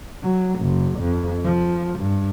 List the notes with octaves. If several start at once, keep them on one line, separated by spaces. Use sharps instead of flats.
F#3
F#1
F2
F3
G2